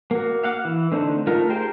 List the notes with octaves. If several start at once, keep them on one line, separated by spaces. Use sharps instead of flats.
A#3 F#4
F5 F#5 D6
E3
D3 A3 C4 D#4
A3 D#4 F4 A#4
G4 G#4 A#4 C5 G5